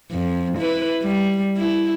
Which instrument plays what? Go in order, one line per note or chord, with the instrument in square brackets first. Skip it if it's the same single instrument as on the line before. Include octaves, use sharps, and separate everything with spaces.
[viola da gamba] F2
E4 B4
G3
E4